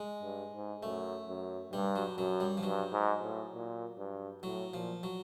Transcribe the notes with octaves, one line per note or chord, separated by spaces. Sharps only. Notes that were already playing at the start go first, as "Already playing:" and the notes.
Already playing: G#3
G2
G#2
F#2 A3
F#2
G2 G3
F#3
F#2 F#3
G3
F3
G2 F#3
G#2
A2
A#2
G2
A2 F#3
A#2 F3
F#3